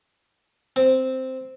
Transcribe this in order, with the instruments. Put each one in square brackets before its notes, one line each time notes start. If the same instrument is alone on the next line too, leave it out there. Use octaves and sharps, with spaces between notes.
[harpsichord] C4